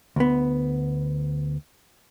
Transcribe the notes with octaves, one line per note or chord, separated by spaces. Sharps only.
D2 B3